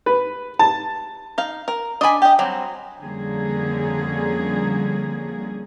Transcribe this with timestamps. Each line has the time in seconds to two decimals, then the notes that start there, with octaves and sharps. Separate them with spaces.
0.06 B4
0.59 A5
1.38 D#4 F5
1.68 A#4
2.01 D4 D#5 G#5 B5
2.22 G4 D#5
2.39 F#3 G3 C4
3.01 F2 D3 G3 A#3 C#4 G#4